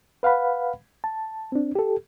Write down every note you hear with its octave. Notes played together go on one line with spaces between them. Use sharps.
B4 F5 F#5 B5
A5
C4 D4
G4 A4